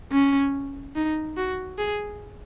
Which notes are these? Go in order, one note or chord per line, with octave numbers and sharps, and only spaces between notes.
C#4
D#4
F#4
G#4